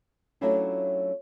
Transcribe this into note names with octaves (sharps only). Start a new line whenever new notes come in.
F#3 A3 C#4 D4 E4 F4